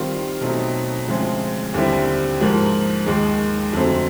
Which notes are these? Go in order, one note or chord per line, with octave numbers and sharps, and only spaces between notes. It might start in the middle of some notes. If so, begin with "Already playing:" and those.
Already playing: D#3 G3 C4 F4
B2 F#3 A3 C4 D#4
D2 C#3 F3 G#3 C4
D#2 D3 G3 C4 E4
G#2 F3 A#3
D#2 D#3 G#3
F2 D3 F#3 A3 C4